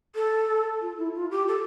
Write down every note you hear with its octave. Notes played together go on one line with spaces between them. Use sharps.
A4
F4
E4
F4
G4
A4